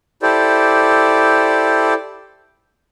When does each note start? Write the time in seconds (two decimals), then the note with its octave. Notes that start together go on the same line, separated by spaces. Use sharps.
0.22 E4 G4 A4 C5 D5